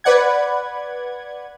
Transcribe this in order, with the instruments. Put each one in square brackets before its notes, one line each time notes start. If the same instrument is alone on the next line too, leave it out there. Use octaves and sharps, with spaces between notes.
[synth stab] B4 D5 F#5 G#6